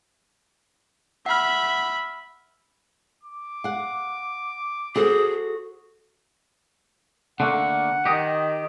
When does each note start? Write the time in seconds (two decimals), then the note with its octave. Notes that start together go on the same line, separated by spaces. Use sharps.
1.26 E5 F#5 B5 F6
3.23 D6
3.64 F5 F#5
4.96 F#4 G#4 A4 C5
7.40 D3 A3 A#3 F#5
8.05 D#3 G4 D#5